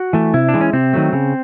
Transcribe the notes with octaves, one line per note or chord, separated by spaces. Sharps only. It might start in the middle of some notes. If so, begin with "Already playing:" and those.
Already playing: F#4
E3 A3
C3 E4
D4
E3 G#3
C#4
C3 C4
D#3 F#3 A3
C#3